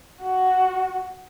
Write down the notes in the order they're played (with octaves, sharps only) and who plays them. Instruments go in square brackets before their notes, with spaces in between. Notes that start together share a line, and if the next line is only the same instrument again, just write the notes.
[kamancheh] F#4